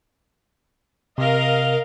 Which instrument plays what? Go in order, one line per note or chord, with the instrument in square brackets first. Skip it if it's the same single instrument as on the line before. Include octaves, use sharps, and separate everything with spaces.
[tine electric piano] C3 [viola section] A#4 D#5 F5